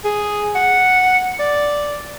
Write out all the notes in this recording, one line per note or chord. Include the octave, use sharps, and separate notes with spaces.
G#4
F#5
D5